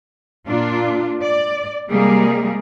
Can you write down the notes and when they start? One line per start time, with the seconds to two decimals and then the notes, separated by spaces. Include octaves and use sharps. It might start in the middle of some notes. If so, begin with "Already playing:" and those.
0.47 A#2 D4 F4
1.22 D5
1.89 C3 G3 G#3 A#3 G#4